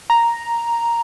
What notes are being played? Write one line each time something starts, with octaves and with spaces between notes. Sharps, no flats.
A#5